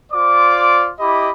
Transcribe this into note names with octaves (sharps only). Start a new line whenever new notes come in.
F4 C5 D5 D6
E4 G4 D#5 B5 D6